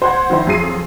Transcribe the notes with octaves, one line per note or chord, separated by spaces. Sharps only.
C5 F#5 G#6
D#3 F3 E4 C5
F2 F#3 G#4 C7 D#7